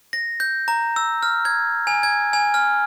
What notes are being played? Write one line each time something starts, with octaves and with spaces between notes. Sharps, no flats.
A#6
G6
A#5
E6
F6
G#6
G#5
G#6
G#5
F6